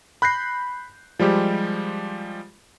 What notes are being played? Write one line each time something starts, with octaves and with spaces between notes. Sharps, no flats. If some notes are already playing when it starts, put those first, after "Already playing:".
B5 F#6 G6 A#6 C7
F3 G3 G#3 G4